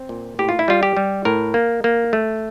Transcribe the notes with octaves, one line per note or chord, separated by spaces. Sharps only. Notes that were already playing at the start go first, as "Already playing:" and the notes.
Already playing: C4
A#2
A2 G4
F4
E4
G3 F4
G4
G3
A2 A#4
A#3
A#3
A3